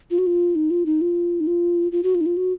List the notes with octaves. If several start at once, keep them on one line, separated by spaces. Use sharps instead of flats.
F4
F#4
F4
D#4
F4
D#4
F4
D#4
F4
F4
F#4
F4
D#4
F4
F#4